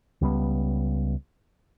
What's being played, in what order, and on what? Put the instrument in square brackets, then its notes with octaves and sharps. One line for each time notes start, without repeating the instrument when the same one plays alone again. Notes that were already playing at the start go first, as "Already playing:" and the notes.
[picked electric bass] C#2 G3 B3